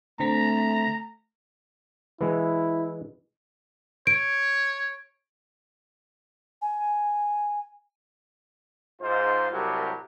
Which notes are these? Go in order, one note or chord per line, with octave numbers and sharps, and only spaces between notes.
D3 A3 C4 A#5 B6
E3 G#3 E4
C#5 D7
G#5
G#2 F4 C5
C2 A2 C3 F#3 G4 A#4